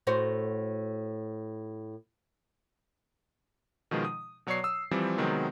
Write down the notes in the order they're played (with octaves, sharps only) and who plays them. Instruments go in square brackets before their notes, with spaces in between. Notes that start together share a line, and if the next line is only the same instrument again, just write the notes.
[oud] A2 F#4 C5
[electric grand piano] B2 D#3 F3 G#3 D#4
D#6
B2 F#3 C#5 D5 C#6 C7
D#6 E6
E3 F3 G3 C4
C3 D#3 F#3 G#3 B3 C4